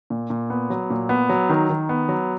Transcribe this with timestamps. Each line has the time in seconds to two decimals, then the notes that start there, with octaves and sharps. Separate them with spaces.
0.10 A#2
0.30 A#2
0.50 B3
0.70 F#3
0.90 A#2
1.09 B3
1.29 F#3
1.49 D#3
1.69 D#3
1.89 B3
2.09 F#3